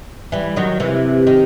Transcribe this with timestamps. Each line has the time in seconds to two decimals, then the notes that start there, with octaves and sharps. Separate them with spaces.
0.32 E3 G3
0.56 D#3 F#3
0.80 C3 E3
1.27 D#3